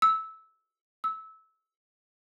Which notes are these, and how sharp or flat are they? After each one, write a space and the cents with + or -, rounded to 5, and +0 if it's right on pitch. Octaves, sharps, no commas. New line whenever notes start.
E6 -15
E6 -20